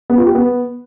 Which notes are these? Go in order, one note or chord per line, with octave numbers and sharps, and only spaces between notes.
B3
F4
G4
B3